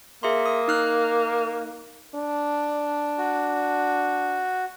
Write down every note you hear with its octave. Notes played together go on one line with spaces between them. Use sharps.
A#3 G#4 E5 C6
D#6
D#4 F6 F#6
D4
F#4